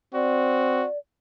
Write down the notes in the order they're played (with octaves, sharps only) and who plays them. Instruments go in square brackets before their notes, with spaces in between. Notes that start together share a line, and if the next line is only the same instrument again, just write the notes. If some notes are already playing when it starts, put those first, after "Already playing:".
[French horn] C4 [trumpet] F#4 [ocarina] D5